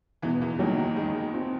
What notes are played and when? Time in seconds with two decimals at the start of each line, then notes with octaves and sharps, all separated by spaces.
0.22 E2 B2 E3
0.42 E2 E3
0.59 D#2 D#3 F#3 A#3
0.78 D#2 D#3
0.96 D#2 D#3 G#3
1.33 C4 F4